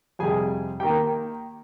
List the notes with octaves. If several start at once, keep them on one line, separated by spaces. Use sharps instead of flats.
F2 C3 G3 G#4 G#5
D#3 A#3 G4 G5